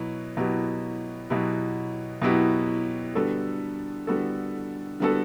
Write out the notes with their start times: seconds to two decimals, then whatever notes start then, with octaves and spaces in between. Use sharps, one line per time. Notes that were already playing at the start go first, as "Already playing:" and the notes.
Already playing: B2 F#3 B3 E4
0.37 B2 F#3 B3 E4 G4
1.30 B2 F#3 B3 E4 G4
2.22 B2 F#3 B3 E4 G4
3.15 D3 G3 B3 F#4 A4
4.07 D3 G3 B3 F#4 A4
5.00 D3 G3 B3 F#4 A4